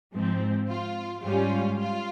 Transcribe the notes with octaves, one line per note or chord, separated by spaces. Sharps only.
G#2 F3 C4
F4
G#2 G3 C#4 F4
F4